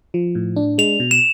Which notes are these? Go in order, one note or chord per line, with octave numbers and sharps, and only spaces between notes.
F3
A2
D4
G#3 F7
B2
E7